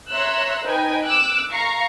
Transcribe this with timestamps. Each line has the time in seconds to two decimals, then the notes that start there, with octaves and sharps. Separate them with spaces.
0.12 C#5 E5 A#5 C6 E6 F#6
0.64 D#4 B4 C5 G5 G#5
1.06 D6 E6 F#6
1.52 F5 A#5 C#6 C7